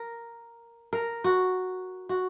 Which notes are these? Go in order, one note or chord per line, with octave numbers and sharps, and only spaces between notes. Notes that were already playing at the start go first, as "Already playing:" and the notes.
Already playing: A#4
A#4
F#4
F#4